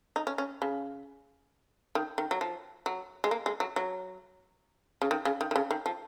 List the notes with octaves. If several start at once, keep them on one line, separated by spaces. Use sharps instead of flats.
D#4
C#4
C#4
C#3
D#3
D#3
F#3
F3
F#3
G#3
A#3
G#3
F#3
F#3
C#3
D#3
C#3
D#3
D#3
C#3
D#3
F3